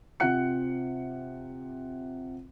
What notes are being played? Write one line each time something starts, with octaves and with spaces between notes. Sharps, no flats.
C3 C4 F4 F#5 F#6 C#7